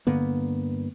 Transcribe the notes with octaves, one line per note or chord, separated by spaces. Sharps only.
G2 D3 A#3 B3